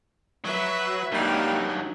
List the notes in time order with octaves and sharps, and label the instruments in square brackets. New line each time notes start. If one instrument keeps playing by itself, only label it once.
[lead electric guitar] F#3 [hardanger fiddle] B4 E5
[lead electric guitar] G2 F#3 [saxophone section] G3 A#3 [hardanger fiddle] D#4